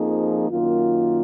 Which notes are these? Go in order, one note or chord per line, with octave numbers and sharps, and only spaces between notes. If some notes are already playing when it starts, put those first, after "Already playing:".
Already playing: F2 F3 A#3 D#4 G#4
F#2 D#3 A#3 F4